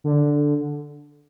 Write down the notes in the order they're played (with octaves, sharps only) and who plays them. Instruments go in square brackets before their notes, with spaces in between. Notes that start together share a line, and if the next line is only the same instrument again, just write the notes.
[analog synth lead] D3